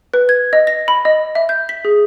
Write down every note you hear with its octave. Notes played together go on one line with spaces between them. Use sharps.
B4
G#6
D#5
A#6
B5
D#5
E5
G6
B6
G#4